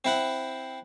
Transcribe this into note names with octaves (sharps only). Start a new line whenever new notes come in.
C4 E4 F#5